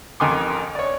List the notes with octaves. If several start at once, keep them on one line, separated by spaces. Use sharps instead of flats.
A1 F2 D#3 G#5 C6 D6
C#5 D5